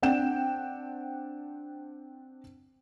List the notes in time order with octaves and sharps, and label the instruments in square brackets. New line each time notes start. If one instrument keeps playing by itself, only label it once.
[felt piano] C4 D4 F#5 G5 E7